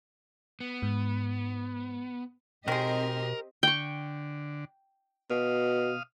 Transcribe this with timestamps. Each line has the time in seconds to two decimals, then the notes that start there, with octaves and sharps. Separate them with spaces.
0.60 B3
0.82 G#2
2.68 B2 D#3 G#3 C4 G4 A#4 D#5
3.63 D3 G5 C#6
5.30 B2 F5 D#6 F6